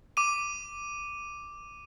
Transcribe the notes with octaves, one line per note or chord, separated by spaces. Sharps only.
D6 D#7